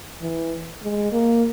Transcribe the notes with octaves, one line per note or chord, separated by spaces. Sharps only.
E3
G#3
A#3